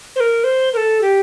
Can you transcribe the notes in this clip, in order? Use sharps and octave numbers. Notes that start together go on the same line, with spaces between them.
C5
A#4
C5
A#4
A4
G4